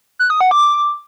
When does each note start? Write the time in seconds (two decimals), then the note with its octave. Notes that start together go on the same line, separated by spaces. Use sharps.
0.19 F#6
0.30 D#6
0.41 F#5
0.51 D6
0.62 D6